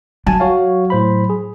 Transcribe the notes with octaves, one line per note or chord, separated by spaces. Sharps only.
F#3 G#5 A5
F#4 C#5 F5
A2 C5 B5
G#4